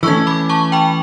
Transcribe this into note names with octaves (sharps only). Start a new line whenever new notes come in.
E3 A3 C#4 C#6 E6
B5 D6
A5 C#6
G5 B5